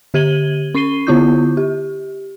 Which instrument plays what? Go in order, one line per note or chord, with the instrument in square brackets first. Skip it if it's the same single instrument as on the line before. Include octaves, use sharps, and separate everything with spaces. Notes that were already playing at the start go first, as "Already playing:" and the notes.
[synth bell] D3 G4 G#6 D#7 F#7 G7
C#4 C#6 C7 D#7 G7
D3 B3 E4 F4 C#6 G6
G4